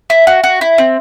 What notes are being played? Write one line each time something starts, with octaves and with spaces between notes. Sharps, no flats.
E4
F#4
F#4
E4
C4